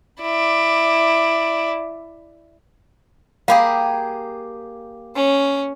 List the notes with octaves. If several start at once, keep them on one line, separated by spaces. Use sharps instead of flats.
E4 D5
A#3 G4 G#4 F5 B5
C#4